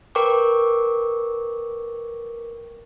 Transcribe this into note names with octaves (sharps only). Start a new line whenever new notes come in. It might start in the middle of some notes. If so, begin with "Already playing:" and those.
A#4 B4 G5 C#6 D6